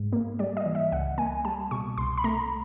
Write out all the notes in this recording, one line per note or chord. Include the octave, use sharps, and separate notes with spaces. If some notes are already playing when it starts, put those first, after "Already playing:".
Already playing: G#2
A#3
G3 D5
D#5
E3
E5
C#2 F#5
A#3 G#5
G3 A5
B2 C#6
C2 C6
B5
A3 A#5